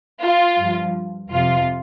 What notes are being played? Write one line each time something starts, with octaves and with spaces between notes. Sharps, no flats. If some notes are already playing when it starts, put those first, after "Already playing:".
F4
G2 F3
F2 C3 F3 F4